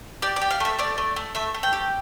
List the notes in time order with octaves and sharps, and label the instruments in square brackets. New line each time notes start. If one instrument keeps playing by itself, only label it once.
[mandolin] G4 D5
D5
G4
F5
A3 E5
A3 D5
A3
A3
A3 E5
A3
G5
G4